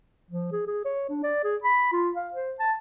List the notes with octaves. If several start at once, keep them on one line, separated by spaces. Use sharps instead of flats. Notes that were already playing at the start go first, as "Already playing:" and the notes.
F3
G#4
G#4
C#5
D4
D5
G#4
B5
F4
F5
C5
A5